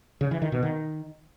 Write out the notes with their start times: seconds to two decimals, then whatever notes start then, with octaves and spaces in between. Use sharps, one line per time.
0.21 C#3
0.31 E3
0.42 D#3
0.52 B2
0.63 D#3